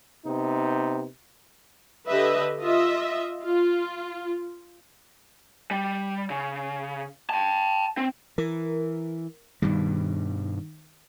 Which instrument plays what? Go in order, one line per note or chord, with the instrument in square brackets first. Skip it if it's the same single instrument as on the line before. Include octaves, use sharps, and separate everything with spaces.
[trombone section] C3 B3 D#4
[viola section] D3 G4 B4 D#5 E5
F4 D#5 E5
F4
[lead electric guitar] G3
C#3
G5 A5
C4
[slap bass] E3 [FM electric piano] A#4
[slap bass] G2 B2 G3 [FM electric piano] D#3